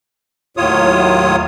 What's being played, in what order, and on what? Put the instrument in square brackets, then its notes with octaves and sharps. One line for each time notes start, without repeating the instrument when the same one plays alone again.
[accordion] D#2 A2 F#3 F4 C#5 D#6